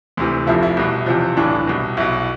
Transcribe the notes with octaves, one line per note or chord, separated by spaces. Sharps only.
D2 C3 E3
F1 F2 C3 F3 E4
E4
C2 B2
E2 C3 F3
B1 A2 E3 D4
C2 B2
B1 B2 E4